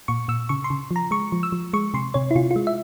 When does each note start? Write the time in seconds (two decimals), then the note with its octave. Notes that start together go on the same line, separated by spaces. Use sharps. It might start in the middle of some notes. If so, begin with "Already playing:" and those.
0.08 A#2 C#6
0.28 A#2 E6
0.49 C#3 C#6
0.64 C6
0.70 C#3
0.91 F3
0.96 A#5
1.11 G#3 C#6
1.32 F3
1.43 E6
1.52 F3
1.73 G#3 C#6
1.94 C3 C6
2.14 C3 C#5
2.31 E4
2.35 C3 F4
2.51 F4
2.56 G#3
2.67 E5